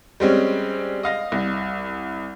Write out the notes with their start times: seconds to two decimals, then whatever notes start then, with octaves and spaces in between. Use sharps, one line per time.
0.20 G3 G#3 C4 C#4
1.03 D#5 F5 A#6
1.32 C2